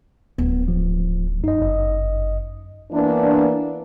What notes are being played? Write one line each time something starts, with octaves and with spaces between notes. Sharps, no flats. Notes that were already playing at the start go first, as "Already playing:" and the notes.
D1 B3 C4
F3
F#2 D#4 D#5
G1 D#5
E3 A#3 B3 D4